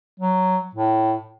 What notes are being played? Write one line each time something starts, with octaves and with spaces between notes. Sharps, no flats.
F#3
A2